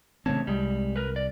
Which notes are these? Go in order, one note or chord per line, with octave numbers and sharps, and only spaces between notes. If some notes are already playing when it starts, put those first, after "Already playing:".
E2 C#3 A3 C4 C#5 A5
C2 G3 G#3
A#4 B4
D5